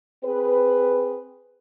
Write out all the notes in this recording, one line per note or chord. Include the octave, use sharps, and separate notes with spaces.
C4 G#4 B4